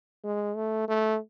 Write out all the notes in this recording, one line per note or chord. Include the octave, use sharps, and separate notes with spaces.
G#3
A3
A3